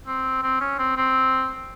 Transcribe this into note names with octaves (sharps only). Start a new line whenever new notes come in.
C4
C4
C#4
C4
C4